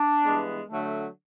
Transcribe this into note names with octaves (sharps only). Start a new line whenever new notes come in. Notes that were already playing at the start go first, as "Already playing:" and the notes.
Already playing: D4
G2 E3 G#3 B3
D3 F#3 A3